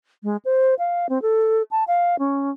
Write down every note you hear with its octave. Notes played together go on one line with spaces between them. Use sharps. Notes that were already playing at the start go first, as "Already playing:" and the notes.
G#3
C5
F5
C4
A4
A5
F5
C#4